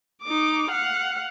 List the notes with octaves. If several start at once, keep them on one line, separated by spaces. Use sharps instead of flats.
D#4 D6
F5 F#5